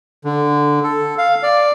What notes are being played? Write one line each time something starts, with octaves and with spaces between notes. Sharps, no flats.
D3
A4
F5
D5